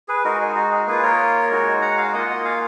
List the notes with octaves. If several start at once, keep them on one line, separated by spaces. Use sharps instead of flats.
G#4 B4
G#3 D#4 F#4 A#4
G#4
F#4
G#4
A#3 F4 G#4 B4
A#4 C#5
G#3 D#4 F#4
F#5 A#5
F5 G#5
A#3 F4 D#5 F#5
F5 G#5